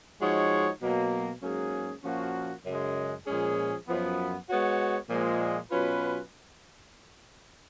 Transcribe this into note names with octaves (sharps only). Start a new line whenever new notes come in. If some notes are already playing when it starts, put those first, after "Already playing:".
F3 G#3 D#4 F#4 C#5
B2 F#3 A#3
G#2 F#3 A#3 C#4 G#4
A#2 F3 A#3 C#4 F#4
F#2 C#3 G#3
A#2 F3 G#3 C#4 G#4
F#2 F3 B3
G#3 B3 F#4 C#5
A#2 F3 G#3
B2 F#3 C#4 F4 B4